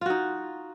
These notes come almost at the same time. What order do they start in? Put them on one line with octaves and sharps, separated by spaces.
F4 F#4 D#4